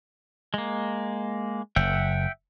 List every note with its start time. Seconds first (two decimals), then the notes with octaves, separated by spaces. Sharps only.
0.54 G#3 A#3
1.76 F#1 E5 F#5 G5